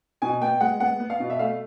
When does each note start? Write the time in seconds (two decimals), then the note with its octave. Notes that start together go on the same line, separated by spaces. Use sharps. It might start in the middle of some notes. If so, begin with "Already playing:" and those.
0.22 B2 G#5
0.41 B3 G5
0.61 G#3 F#5
0.80 B3 F#5
1.00 B3
1.10 F5
1.20 B2
1.30 E5
1.39 A3 F5